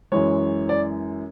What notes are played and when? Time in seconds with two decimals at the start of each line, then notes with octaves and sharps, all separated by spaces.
0.12 F#2 E3 G#3 C#5
0.69 D5